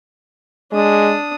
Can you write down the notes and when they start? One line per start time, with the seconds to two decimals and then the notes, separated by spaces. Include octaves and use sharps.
0.72 G#3 D4 D#6